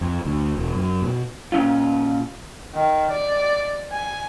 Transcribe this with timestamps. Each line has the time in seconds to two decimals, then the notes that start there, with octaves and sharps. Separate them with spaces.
0.01 F2
0.25 D2
0.57 E1
0.75 F#2
1.02 B2
1.52 A#2 C#4 F4
2.75 D#3
3.11 D5
3.93 G#5